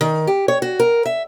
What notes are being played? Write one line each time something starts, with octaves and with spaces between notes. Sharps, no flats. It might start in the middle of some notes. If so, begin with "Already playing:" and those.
D#3
G4
C#5
F#4
A#4
E5